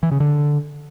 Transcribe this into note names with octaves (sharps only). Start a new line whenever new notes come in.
E3
C#3
D3